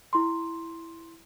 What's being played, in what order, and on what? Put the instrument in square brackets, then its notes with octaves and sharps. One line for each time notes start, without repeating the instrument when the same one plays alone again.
[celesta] E4 C6